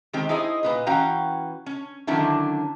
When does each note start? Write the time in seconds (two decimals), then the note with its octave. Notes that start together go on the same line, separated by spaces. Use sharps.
0.13 D#3 G#3 C4 G4
0.29 D#4 E4 G#4 C5 D#5
0.63 A#2 B4 D#5
0.86 E3 C#4 F#4 F5 G5 A#5
1.66 C#4
2.07 D3 D#3 F#3 C#4 D4 E4